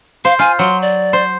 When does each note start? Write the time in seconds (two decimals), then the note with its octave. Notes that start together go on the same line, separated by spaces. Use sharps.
0.25 C5 F5
0.39 F4 G#5
0.59 F#3 C6
0.82 D5
1.13 C5